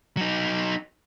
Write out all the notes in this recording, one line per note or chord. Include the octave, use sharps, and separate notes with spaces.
F#3 D#4